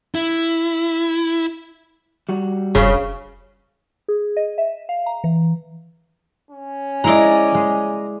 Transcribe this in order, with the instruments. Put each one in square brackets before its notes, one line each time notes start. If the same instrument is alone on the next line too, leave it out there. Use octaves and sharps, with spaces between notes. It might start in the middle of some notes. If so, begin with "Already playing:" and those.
[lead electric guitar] E4
[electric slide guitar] G3 F#4
[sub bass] F1 [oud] C#3
[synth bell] G#4
D#5
E5
F5
A#5
E3
[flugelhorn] C#4
[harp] G#3 E4 D5 [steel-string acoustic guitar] D#5 A#5
[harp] G#3